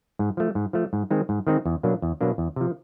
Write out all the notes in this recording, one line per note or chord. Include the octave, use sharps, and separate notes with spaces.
G#2
F3 A3
G#2
F3 A3
G#2
D#3 G#3 C4 D#4
G#2
D#3 G#3 C4 D#4
E2
B2 F#3 A#3 D4
E2
B2 F#3 A#3 D4
E2
C3 F3